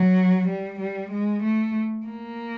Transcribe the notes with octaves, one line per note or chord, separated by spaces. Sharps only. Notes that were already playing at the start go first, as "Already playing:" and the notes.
Already playing: F#3
G3
G3
G#3
A3
A#3